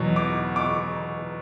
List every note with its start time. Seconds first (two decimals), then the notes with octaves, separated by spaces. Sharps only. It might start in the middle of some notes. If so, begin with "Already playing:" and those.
Already playing: E2 B2 F#3
0.16 D6
0.56 D6
0.60 C#6